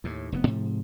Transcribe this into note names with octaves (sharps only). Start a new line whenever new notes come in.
D#2 A2
F1 C3 B3
G#2 C3 F3